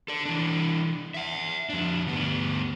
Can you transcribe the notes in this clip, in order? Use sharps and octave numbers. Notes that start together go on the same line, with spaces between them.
A4 D5
E3 D4
E5 F#5
F2 D4
D2 B3